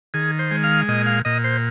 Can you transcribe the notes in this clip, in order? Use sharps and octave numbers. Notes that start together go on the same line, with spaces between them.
D#3 G#4
C5
G#3
F5
A#2 D#5
F5
A#2 D#5
C5